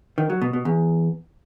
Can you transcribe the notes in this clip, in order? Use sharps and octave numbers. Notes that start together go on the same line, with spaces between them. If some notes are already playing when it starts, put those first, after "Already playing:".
D#3
F#3
B2
B2
E2